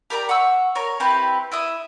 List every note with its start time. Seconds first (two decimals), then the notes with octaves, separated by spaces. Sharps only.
0.10 G4 A#4 D5 A#5
0.29 F#5 C#6 E6
0.75 A#4 C#5
1.00 C4 E4 G4 B4
1.52 E4 E5 D#6